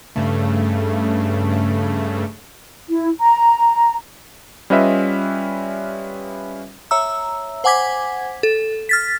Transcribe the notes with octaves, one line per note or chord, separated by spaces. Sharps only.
G2 C#3 A3
E4
A#5
G3 C#4 F4 B4 D#5 E5
C#5 E5 A#5 E6
C5 F#5 G#5 D6 G#6 B6
A4
F6 A6 B6